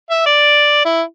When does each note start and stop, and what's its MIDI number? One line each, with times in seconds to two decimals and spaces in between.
0.10 0.24 76
0.26 0.84 74
0.85 1.02 64